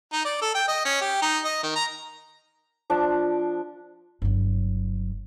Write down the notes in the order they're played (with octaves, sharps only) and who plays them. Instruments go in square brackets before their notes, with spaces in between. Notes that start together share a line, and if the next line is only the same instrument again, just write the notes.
[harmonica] D#4
D5
A4
G5
D#5
C#4
G4
D#4
D#5
D#3
A#5
[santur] F3 D4 D6
[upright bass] G1 F#3